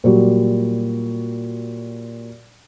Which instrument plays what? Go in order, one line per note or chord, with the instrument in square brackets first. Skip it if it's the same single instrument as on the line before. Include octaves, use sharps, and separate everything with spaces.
[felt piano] A#2 F#3 G3